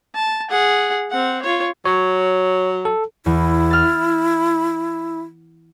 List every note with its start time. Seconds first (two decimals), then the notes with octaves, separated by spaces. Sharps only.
0.14 A5
0.50 G#4 F#5
1.10 C4 F#5
1.42 F4 C#5
1.85 F#3 C#5
2.85 A4
3.26 E2 E4
3.71 F6 A6